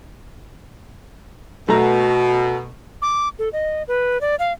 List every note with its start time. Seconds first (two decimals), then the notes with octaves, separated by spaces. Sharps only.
1.68 B2 A3 A#5
3.02 D6
3.39 A4
3.53 D#5
3.88 B4
4.21 D5
4.39 F5